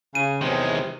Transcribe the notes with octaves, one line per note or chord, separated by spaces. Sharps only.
C#3 D#7
E2 C3 D#3 E3 F#3 G#3